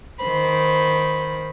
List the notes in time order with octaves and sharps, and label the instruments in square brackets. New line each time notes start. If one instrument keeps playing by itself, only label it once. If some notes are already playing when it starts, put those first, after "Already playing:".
[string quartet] D#3 C5 B5